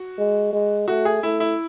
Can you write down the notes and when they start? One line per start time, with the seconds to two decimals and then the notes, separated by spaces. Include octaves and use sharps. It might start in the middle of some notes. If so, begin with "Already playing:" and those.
Already playing: F#4
0.18 G#3
0.53 G#3
0.88 A3 F#4
1.05 G#4
1.23 A3 E4
1.40 E4